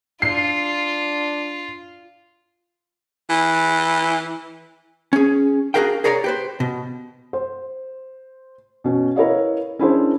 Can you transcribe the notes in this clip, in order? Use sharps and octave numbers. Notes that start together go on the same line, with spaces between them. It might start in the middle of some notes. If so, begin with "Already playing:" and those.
D4 F4 C7
E3
C#4 G#4
D4 F#4 G#4 A#4 F5 G5
G#4 A#4 C#5 D5 A#5
G4 B4 C5
B2
C5
B2 C#4
E4 A#4 B4 C#5 D#5 F5
C#4 D4 E4 G#4 A#4 C5